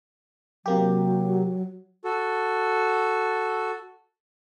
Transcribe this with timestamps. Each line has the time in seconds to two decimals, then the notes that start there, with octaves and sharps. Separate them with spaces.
0.66 C3 F#3 A#3 G4
2.04 F#4 A4